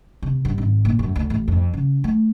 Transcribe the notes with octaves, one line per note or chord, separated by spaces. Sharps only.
C3
G2
G#1
A#2
F#2
D2
A1
F2
C#3
A3